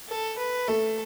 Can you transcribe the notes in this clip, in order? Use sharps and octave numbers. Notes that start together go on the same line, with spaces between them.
A4
B4
A3 A4